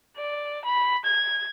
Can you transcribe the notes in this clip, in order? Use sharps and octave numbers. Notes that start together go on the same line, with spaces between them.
D5
B5
G#6